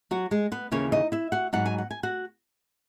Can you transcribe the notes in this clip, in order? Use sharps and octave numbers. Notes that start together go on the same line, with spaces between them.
F#3 F#4
G#3 G#4
B3 B4
D#2 C#3 E3 A#3 C#4 C#5
D#4 D#5
E4 E5
F#4 F#5
G#2 F#3 B3 D#4 F#5
G#5
F#5
G#5
F#4 F#5